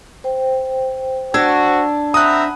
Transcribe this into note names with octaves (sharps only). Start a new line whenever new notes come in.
C5 G5
D4 F#4 E6 G#6
C4 E5 F#5 A#5 B5 D#6 F#6